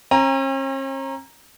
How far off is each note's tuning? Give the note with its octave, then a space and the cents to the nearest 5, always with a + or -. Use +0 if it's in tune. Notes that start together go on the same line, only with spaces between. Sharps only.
C#4 -45 G5 +45 A#5 +0